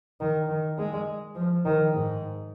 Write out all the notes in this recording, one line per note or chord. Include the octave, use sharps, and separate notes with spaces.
D#3
D#3
G#3
F3
D#3
G#2